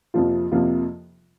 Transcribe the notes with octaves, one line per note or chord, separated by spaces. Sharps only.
F2 C3 F3 A#3 F4
F2 C3 F3 A#3 F4